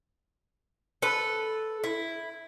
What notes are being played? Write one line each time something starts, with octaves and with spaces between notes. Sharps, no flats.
A4 B4
E4